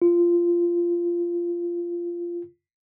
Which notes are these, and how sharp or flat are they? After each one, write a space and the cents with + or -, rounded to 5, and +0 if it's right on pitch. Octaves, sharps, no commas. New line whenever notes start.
F4 -15